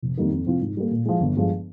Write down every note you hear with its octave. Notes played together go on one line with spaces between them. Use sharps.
F1
F2 D#3 G3 A#3
F2
C3 F3 C4 F4
G#2
G3 A#3
A#2
F3 G#3
G1
G2 F3 G#3